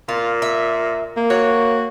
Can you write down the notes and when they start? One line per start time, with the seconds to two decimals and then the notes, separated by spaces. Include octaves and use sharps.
0.09 A#2 F4
0.42 E5
1.17 A#3
1.30 F#4 C#5